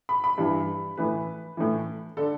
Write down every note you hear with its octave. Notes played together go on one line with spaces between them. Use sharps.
B5
B5
G2 E3
A2 E3 B4
A2 E3
D3 A4